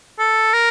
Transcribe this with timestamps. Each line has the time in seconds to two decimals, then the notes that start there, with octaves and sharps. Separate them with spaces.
0.19 A4
0.53 A#4